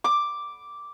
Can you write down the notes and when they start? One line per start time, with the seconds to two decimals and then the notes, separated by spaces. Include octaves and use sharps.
0.04 D6